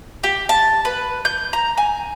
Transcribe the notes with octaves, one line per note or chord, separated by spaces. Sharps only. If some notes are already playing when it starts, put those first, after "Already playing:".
G4
A5
B4
G6
A#5
G#5